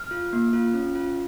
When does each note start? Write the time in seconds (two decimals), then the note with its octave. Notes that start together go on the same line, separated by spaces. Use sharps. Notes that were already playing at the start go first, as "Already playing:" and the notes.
Already playing: F6
0.11 F4
0.33 A#3
0.53 F4
0.74 C#4
0.95 F4